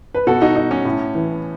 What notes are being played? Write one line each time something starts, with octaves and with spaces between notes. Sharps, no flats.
B4
B2 F#4 A4
D#4 F#4
D#4
C#4
A2
E3